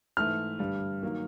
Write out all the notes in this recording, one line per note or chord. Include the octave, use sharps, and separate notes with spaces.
G#2 E3 A3 F6
G2 D3 G3
D#3 F#3 A#3